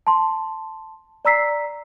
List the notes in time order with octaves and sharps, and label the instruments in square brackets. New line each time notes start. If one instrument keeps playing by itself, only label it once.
[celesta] A5 C6
D5 A#5 E6 B6 C7